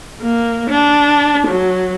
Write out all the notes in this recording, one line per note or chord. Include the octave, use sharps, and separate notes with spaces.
A#3
D4
F#3